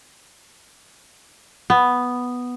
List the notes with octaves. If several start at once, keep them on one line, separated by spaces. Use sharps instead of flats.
B3